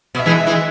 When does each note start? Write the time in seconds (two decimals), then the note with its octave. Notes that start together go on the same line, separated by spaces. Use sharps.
0.15 B2 E5
0.26 E3 G#3
0.47 E3 G#3